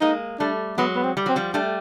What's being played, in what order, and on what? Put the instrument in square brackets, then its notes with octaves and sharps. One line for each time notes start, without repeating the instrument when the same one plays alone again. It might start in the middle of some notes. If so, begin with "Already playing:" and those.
[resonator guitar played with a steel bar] G#3 A#3 [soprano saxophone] D#4
[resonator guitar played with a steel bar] G3 A3 [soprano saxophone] D4
[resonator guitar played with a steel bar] F#3 G#3 [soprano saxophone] B3
[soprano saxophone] B3
C4
[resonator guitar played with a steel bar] G3
[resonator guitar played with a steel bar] F#3 [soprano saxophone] C4
[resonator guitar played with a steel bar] F3 G3
[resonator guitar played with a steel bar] G3 A3 [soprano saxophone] D4